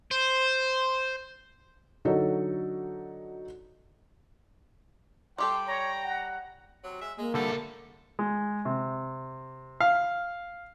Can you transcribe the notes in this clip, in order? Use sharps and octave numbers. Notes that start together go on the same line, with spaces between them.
C5
D3 F#3 D#4 F#4 A4
G3 G4 A4 G5 C6
C#5 A#5
F#5
C3 F#3
G#3 E5
G#3 A#3
C2 B2 D3 G3 A3 A4
G#3
C3
F5